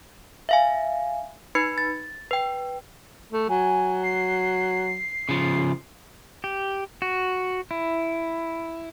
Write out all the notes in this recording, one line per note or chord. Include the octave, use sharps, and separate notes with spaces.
E5 F5 G#5
D#4 B4 B5 G#6 C#7
A6
B4 G5
A3
F#3 G#5
C7
C#3 F3
G4
F#4
E4